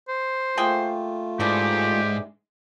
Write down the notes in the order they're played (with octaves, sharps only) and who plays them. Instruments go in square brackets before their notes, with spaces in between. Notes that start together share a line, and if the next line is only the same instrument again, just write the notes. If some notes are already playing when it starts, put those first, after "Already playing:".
[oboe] C5
[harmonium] A3 F4 [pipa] A#3 G#4 G5
[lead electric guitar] G#2 [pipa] E3 G3 D4 [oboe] G4